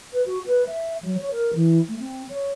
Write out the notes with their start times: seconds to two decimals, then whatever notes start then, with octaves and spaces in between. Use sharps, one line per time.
0.13 B4
0.26 F#4
0.46 B4
0.67 E5
1.03 F#3
1.18 C#5
1.31 A#4
1.54 E3
1.88 A3
2.00 C4
2.29 C#5